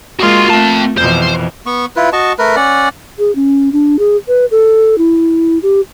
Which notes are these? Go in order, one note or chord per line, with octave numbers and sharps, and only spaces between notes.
G#3 A#3 F4 F#4 C6
A3 C4 A5
F2 B2 E3 C5
B3 C#6
E4 F4 B4
F#4 D#5 A5 C#6
A3 A#4 B4
C#4 D5 F#5
G#4
C#4
D4
G#4
B4
A4
E4
G4